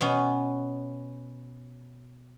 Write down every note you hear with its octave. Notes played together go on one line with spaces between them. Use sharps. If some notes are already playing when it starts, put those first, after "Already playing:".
B2 B3 C#4